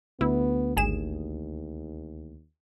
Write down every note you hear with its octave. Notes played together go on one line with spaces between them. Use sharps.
D2 B3 E4
G#1 D#2 G#4 E7